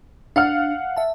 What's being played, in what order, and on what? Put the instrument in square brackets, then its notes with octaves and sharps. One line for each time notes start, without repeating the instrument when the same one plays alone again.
[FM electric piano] D4 [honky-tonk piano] F5 F#5 F6
[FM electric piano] E5 A5